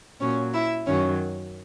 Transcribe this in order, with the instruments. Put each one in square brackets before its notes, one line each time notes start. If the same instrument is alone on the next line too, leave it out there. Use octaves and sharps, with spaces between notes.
[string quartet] A#2 F#3 C#4 C#5
E4 E5
F#2 D#3 F#3 C#4 C#5